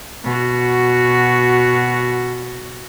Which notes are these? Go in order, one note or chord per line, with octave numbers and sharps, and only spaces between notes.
B2 F#4